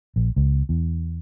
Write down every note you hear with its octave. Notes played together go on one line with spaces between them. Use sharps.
A#1
C#2
E2